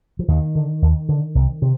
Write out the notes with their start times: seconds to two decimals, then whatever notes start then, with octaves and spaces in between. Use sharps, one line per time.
0.19 F3
0.28 D#2 D#3
0.55 D3
0.82 D#2
1.09 D3
1.35 C2
1.62 C3